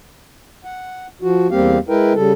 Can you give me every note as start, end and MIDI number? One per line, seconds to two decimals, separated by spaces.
0.64 1.07 78
1.22 1.48 53
1.22 1.48 66
1.51 1.78 40
1.51 1.78 55
1.51 1.78 58
1.51 1.78 60
1.51 1.78 67
1.51 1.78 77
1.89 2.13 56
1.89 2.13 64
1.89 2.13 70
1.89 2.13 71
1.89 2.13 79
2.14 2.33 49
2.14 2.33 55
2.14 2.33 69